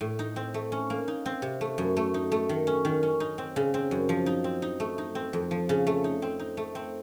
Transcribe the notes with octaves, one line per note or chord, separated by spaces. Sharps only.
A2
D#4
C4
A3
C#4
A#3
D#4
C4
C3
A3
F#2
A3
D#4
A3
D#3
C#4
D#3
C#4
D#4
C4
C#3
C4
F#2
F3
D#4
C4
D#4
A3
D#4
C4
F2
F3
C#3
A3
D#4
C4
D#4
A3
C4